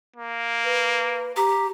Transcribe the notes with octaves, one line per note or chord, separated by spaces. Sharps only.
A#3
B4
G4 A#5